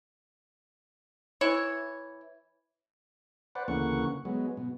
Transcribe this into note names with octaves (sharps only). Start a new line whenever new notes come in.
E3 E4 C#5
B4 C5 D5 F#5
D2 C#3 E3 A#3 F#5 C#6
F#3 G#3 B3
B2